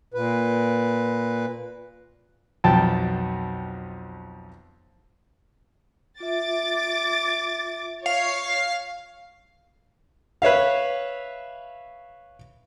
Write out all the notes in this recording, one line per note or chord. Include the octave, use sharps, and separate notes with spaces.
A#2 B4
B1 F2 G5 A5
F4 E5 D6 A6
C#5 F5
B4 C#5 E5 F5